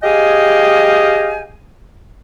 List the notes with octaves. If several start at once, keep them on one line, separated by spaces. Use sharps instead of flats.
G4 G#4 D#5 F5 G5 G#5